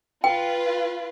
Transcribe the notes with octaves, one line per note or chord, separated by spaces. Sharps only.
F4 B4 G5